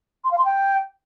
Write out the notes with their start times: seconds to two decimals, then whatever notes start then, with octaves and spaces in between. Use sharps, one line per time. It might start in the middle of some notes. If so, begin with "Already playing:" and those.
0.24 C6
0.31 F5
0.38 C6
0.45 G5